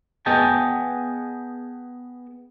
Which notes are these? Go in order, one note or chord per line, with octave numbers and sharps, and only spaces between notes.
B3 G#4 D#5 G5 A5